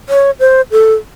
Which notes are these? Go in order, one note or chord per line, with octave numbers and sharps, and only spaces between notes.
C#5
C5
A4